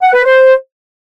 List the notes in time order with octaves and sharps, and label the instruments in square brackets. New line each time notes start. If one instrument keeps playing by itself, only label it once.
[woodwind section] F#5
B4
C5